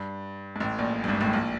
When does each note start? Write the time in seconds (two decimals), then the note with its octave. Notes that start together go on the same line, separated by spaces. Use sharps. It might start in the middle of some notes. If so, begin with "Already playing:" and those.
Already playing: G2
0.56 G#2
0.60 A1 A2
0.79 A#1 A#2
1.04 G2
1.08 G#1 G#2
1.21 A1 A2
1.33 A#1 A#2